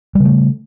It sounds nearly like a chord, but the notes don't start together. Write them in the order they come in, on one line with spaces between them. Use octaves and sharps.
G3 C#3 A3